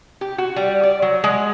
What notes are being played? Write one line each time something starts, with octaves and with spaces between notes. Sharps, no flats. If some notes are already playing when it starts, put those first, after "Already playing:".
G4
F#4
G3
D5
F#3
G#3